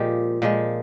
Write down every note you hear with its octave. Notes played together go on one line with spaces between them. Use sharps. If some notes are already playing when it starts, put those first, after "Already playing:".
Already playing: A#2 F3 G#3 G4
A#2 F3 G#3